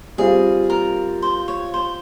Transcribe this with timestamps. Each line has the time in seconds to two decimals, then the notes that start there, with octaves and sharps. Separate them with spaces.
0.18 G3 C4 F4 G#4
0.70 A#4
1.22 C5
1.48 C#5
1.74 C5